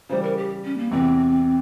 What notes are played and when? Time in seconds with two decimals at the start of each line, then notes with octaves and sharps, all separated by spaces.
0.09 C#3 E3 G3 C5
0.22 A#4
0.36 G4
0.64 C#4
0.78 A#3
0.90 E2 C3 E3 C4